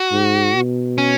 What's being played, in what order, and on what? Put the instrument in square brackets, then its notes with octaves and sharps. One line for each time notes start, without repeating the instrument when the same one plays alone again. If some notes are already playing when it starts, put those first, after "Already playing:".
Already playing: [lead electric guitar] F#4
[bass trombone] G#2
B2
[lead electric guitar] C#4